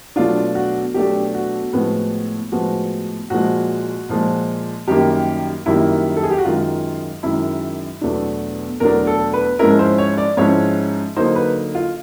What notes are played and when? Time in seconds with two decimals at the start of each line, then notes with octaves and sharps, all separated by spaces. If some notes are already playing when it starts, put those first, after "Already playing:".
0.16 B2 F#3 A3 D4 F4
0.55 F#4
0.94 B2 F#3 A3 D4 G4
1.35 F#4
1.73 A2 F3 G#3 B3
2.52 A2 F3 G#3 B3 F#4
3.30 A#2 F3 G#3 F#4
4.09 A#2 F3 G#3
4.88 F#2 D#3 G3 A#3 G4
5.66 F#2 D#3 G3 A#3 E4
6.17 A4
6.24 G#4
6.31 G4
6.38 F#4
6.45 F#2 D#3 G#3 F4
7.23 F#2 D#3 G#3 E4
8.01 E2 B2 F#3 A3 D4
8.80 E2 B2 F#3 A3 D4 A#4
9.07 A4
9.33 B4
9.59 G#2 F3 G#3 C#4 E4 A#4
9.79 C5
9.98 C#5
10.18 D5
10.37 G#2 F3 G#3 C#4 E4 C#5
11.16 D3 F#3 A#3 D#4 C5
11.36 B4
11.75 F4